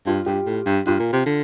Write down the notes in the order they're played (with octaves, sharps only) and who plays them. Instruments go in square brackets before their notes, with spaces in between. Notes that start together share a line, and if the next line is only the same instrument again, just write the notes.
[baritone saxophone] G2 [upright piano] F4
[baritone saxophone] G2 [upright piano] G4
[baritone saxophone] A2
G2
[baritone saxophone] G2 [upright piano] F4
[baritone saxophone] A#2
C3
D3